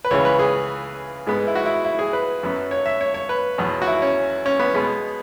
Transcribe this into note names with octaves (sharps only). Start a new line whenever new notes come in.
B4
C#2 C#3 E3 C#5
B4
G#4
G#2 G#3 B3
E4
F#4
E4
E4
G#4
B4
F#2 F#3 B3
C#5
E5
C#5
C#5
B4
E2 B2 F#3 B3
F#4
E4
C#4
C#4
B3
B2 G#3 B3